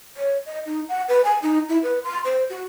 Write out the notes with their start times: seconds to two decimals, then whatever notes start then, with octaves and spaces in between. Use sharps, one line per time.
0.17 C#5
0.46 D#5
0.66 D#4
0.89 F#5
1.08 B4
1.24 G#5
1.42 D#4
1.69 E4
1.83 B4
2.04 C6
2.25 C5
2.50 F#4